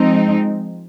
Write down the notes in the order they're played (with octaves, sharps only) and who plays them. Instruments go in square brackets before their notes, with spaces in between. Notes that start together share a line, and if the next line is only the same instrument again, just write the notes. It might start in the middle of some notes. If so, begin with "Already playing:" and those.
Already playing: [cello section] F3 G#3 C4 D#4